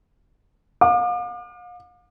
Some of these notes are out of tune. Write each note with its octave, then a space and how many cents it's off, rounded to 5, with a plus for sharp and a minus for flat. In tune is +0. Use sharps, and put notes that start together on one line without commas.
F5 +40 D6 +40